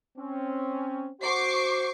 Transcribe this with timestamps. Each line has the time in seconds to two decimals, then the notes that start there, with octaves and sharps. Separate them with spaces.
0.18 C4 C#4
1.21 F#4 C5 C#6 D6 C7